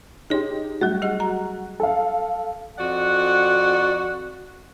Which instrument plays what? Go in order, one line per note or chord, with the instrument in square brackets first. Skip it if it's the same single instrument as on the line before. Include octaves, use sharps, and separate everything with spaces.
[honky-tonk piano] D#4 G4 [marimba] G#4 C#5 C6
[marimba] F#3 G3 A3 [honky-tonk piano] F#4
[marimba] G4 G#4 D#5
A#5
[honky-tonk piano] A4 F5
[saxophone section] F2 F#4 D5 F#5